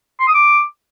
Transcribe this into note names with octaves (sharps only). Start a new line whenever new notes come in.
C6
D#6
D6